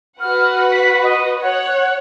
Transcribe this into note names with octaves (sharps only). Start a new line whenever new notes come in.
F#4 B4 F#5 F6
B6
D#5
C#5 F#5